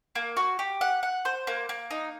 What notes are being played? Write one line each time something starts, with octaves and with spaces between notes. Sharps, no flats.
A#3
F#4
G4
F#5
F#5
C5
A#3
A#3
D#4